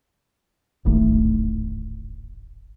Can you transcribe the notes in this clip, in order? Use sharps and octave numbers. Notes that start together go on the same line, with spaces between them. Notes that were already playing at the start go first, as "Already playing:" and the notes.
D1 G#1 A3